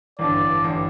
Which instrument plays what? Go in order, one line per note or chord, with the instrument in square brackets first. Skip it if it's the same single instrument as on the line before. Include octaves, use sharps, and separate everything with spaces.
[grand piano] A1 G2 D3 [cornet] D5
[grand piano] A1 G2 D3